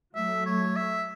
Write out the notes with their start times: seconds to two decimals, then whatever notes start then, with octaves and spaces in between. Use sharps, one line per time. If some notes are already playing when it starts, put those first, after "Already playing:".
0.15 F#3 A3 E5
0.46 C#5
0.76 E5